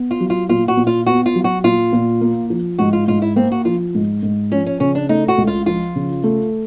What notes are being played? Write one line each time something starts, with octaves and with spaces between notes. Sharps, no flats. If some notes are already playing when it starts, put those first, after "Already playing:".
Already playing: B3
F4
F#3
F4
A#2 F4
F#4
A#2
F4
B3 F#4
F4
F#3
F#4
A#2 F4
A#2
A#3
F3
G#2 F#4
F4
G#2 F4
E4
A#3 C4
F#4
F3 F4
G#2
G#2
F3 C#4
C#4
C#3 C#4
D4
A3 D#4
F#4
C#2
F4
F3 F4
C#3
A3